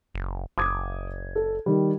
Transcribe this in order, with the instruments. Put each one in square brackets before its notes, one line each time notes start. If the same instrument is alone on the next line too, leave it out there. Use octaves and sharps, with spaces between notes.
[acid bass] F#1
[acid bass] F#1 [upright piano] D6 D#6 G#6
[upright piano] A4
D#3 G3